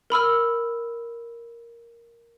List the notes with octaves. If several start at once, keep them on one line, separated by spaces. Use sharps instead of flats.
A#4 B5 E6 F6